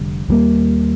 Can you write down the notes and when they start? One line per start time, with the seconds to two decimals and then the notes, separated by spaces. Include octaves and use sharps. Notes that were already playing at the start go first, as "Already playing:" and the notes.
Already playing: F1 D3 G3
0.28 D#2 D#3 G3 A#3